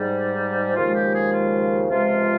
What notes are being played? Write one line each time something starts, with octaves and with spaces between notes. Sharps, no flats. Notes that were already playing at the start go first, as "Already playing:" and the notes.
Already playing: G#2 G3
D#2 C#3 F3 G#3 F4
G4
G#4
F4
C#2 C3 F3 G#3 F4